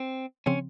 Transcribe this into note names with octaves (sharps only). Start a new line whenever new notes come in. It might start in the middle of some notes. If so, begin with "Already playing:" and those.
Already playing: C4
C#3 F3 C4 C#4